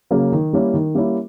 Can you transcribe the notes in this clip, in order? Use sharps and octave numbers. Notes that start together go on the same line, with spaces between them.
C#3 F#3 A#3 C#4
D#3
G3 A#3 C#4 E4
D#3
G3 A#3 C#4 E4